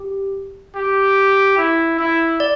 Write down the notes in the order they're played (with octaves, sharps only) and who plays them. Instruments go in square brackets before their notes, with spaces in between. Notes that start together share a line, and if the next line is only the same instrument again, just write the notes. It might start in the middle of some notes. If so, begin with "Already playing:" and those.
Already playing: [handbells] G4
[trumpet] G4
E4
E4
[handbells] D5